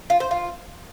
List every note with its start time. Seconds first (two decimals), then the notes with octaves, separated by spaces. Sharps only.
0.10 F4
0.20 C5
0.31 F4